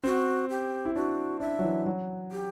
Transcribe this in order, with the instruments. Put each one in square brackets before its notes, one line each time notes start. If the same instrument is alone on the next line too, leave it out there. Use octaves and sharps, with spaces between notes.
[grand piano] C4 [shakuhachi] F#4
[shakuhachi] G4
[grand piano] E4
[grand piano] D4 [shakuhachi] F#4
[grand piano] D4 [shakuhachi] E5
[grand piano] F#3
E3
F#3
[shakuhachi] G4